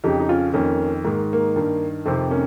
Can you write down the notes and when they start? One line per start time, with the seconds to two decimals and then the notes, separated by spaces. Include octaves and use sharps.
0.04 F2 C#3 D#4 G4
0.20 D#4
0.29 C#4 F4
0.54 F2 D#3 A#3 C#4
1.04 G#2 D#3 A#3
1.33 A#3
1.56 G2 D#3
2.06 F2 C3 D#3 C4
2.31 A#3 C#4